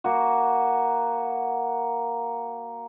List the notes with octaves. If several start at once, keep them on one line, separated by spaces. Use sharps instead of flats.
A#3 F#4